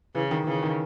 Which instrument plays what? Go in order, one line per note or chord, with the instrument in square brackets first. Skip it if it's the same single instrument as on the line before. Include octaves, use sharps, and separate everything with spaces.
[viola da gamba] C#3 [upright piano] E3
[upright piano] D#3
[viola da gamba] C#3 [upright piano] E3
[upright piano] D#3